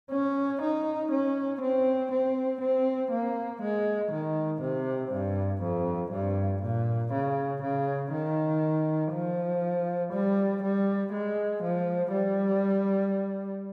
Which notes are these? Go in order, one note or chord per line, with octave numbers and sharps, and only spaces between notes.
C#4
D#4
C#4
C4
C4
C4
A#3
G#3
D#3
C3
G2
F2
G2
A#2
C#3
C#3
D#3
F3
G3
G3
G#3
F3
G3